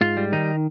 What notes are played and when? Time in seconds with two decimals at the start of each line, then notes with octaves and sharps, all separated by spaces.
0.01 G#2 F4
0.17 G3
0.32 D#3 D#4